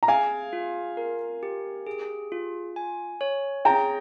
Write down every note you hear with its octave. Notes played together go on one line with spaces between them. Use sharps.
A#5
G#4 F5 G#5
F4
A#4
G4
G#4
F4
G#5
C#5
G#4 G5 A#5